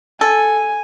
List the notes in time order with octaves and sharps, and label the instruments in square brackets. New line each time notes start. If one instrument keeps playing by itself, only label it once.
[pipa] A4 [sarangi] G#5